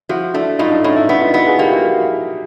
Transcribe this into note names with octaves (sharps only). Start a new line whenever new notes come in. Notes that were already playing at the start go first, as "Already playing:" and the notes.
F3 E4 F#4
A3 D4 E4
A2 D#4 F4
D4 E4
A2 C#4 D#4
D4 E4
B3 D4 E4
D#4 F4
B3 E4 F#4
F#4 G#4
A#3 F4 G4
E4 F#4